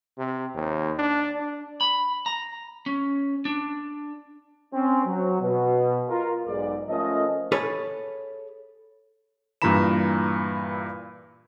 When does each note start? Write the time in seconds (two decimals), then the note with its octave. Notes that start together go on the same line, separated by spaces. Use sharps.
0.18 C3
0.54 D#2
0.99 D4
1.39 D4
1.81 B5
2.26 A#5
2.86 C#4
3.45 D4
4.73 C4 C#4
5.06 F#3
5.41 B2
6.08 F4 A#4
6.47 B1 G#2 D5
6.89 F3 A3 C#4 A4 A#4 D#5
7.52 G#4 A4 B4 C#5
9.62 G2 A#2 E3 A#5 B5 E7